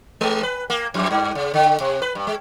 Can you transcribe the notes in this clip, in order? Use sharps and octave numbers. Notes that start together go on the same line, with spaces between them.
G#3
B4
A#3
F2
G2
C#3
D3
C3
B4
G2
G#3